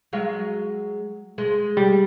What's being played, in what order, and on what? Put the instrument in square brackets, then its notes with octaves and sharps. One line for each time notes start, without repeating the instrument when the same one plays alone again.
[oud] F#3 G#3 F5
G#3
[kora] G3